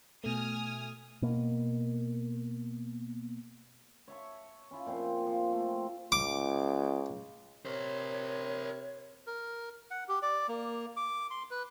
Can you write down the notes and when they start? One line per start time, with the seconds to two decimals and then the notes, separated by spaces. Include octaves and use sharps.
0.24 B2 A3 G#5 D#6 F6
1.22 B2 A#3
4.08 C#5 E5 A5 C#6
4.71 C#4 E4 F4
4.86 A#2 F3 C4
5.27 F3
5.53 A3 C4
6.12 C#2 D6
7.65 C3 A#4 C5 C#5
9.27 A#4
9.91 F#5
10.08 G4
10.22 D5
10.48 A#3
10.97 D6
11.31 C6
11.51 B4